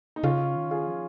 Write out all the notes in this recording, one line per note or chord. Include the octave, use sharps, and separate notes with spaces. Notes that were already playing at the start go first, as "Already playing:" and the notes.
D#4
C#3 C#4 F4
D#3
F4 G#4
F3